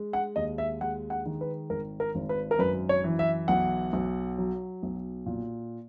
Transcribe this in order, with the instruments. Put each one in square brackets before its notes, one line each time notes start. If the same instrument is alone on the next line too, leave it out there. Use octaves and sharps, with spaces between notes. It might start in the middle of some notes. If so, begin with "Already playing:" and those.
Already playing: [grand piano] G#3
F#5
D#2 D#5
E5
G#3 F#5
F#5
D#3
B4
G#1 A#4
A#4
G#1
B4
A#4
F#2 B4
C#5
E3
E5
B1 F#5
B1
F#3
B1
A#2